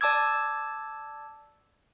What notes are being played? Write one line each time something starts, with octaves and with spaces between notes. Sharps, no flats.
D5 A5 D6 E6 G#6